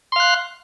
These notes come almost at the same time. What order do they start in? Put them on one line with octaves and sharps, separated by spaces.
C6 F5 F#6